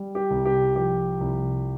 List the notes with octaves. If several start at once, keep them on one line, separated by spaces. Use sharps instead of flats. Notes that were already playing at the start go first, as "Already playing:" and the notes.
Already playing: G3
G4
C2
G4
F3 G4
C2